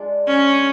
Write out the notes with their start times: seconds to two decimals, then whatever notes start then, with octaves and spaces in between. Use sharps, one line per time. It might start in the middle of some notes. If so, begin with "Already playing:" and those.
Already playing: G#3 D4 F4
0.27 C#4